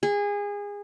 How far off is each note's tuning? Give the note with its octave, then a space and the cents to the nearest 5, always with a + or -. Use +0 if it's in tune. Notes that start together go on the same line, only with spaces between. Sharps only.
G#4 -25